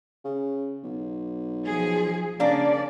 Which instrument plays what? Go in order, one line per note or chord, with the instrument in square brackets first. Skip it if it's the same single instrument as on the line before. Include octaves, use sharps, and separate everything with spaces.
[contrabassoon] C#3
B1
[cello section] F3 G#4
[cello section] C#3 D5 [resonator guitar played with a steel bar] A#3 D4